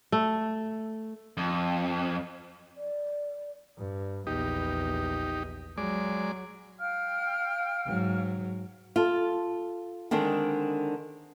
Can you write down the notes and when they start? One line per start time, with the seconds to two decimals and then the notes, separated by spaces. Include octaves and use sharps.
0.12 A3
1.37 F2
2.77 D5
3.78 G2
4.27 A#1 E2 D#4 G4
5.78 F#3 G#3 D5
6.79 F5 G5 F6
7.85 G#2 F#3
8.96 F4 A4
10.11 D3 D#3 G#3 C4 D4